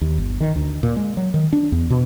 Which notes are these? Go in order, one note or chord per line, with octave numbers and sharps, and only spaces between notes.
D#2
G1
D#3
D2
A#2
G#3
F#3
D#3
D4
E2
B2